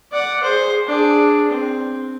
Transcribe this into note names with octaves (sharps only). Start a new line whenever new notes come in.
D5 F#5
G#4 C5
D4 G#4
C4